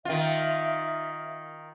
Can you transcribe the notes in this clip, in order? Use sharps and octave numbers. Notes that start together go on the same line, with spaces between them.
D#3 F4 E5